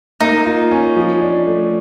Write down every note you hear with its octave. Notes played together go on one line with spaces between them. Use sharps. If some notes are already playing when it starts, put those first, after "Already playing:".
A#3 D#4
F4
C#4
F3
D4
A3